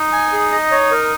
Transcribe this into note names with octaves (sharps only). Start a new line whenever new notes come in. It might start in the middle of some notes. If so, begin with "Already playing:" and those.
Already playing: D#4
G#5
G#4
D#5
C#5
A#4